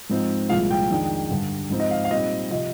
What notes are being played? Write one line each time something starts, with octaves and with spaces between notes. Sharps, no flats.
G#2 F3 C4 D#4
C2 A#2 F3 G#3 F5
G5
F2 D#3 G#3 D4
G2 D3 G3
G#2 F3 C4 D#4
D#5
F5
F5
A#2 G3 C4 D#4 D#5
C3 F3 D#5